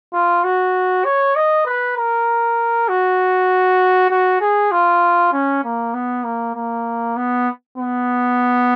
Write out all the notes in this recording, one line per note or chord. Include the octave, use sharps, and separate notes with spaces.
F4
F#4
C#5
D#5
B4
A#4
F#4
F#4
G#4
F4
C#4
A#3
B3
A#3
A#3
B3
B3